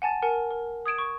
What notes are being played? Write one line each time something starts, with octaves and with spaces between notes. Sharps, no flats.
F#5 G#5 A5 A6
A#4 F#5 G#5 A5
A#4
D#6 G#6 D7 E7
C#6